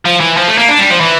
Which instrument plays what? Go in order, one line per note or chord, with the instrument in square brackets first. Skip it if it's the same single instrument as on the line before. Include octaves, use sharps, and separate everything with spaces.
[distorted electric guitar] F3
E3
F3
A3
A#3
D4
G3
F3
E3